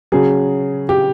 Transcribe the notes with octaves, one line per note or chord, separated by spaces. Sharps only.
C#3 F#3 G#4
G4